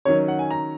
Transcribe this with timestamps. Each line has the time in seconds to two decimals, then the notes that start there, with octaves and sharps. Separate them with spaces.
0.05 D#3 F#3 C#4 C#5
0.28 F#5
0.39 G#5
0.51 A#5